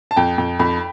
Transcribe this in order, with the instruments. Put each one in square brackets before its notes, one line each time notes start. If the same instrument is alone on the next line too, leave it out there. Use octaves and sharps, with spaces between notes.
[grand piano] A5
[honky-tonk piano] F2 [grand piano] G5
[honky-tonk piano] F2
[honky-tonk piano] F2 [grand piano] B5